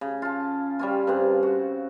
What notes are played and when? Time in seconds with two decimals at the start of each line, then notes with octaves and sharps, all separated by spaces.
0.01 C#3
0.22 F4 A5
0.79 G3 C#4 F4
1.07 G2 C#3 C4
1.43 F#4